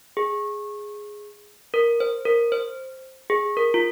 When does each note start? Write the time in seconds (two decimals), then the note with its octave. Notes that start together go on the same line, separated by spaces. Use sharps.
0.17 G#4
1.74 A#4
2.00 C5
2.25 A#4
2.52 C5
3.30 G#4
3.57 A#4
3.74 F4